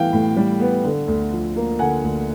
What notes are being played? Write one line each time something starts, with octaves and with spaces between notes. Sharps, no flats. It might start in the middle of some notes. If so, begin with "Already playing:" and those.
Already playing: A2 E3 G3 B3 F5 G5
A2
G3
B3
D3
D2
F3
A#3
D3 F#5 G#5
D2